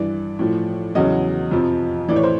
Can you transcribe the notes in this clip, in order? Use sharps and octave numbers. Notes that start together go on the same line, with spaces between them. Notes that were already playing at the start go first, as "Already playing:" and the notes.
Already playing: G2 E3 D5
A2 F3
E2 C#3 F#3 D#5
F2 C3 F3
A2 E3 D5
C#5
C5